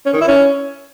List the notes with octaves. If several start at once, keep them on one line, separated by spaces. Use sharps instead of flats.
C#4
D#3
E4
C#4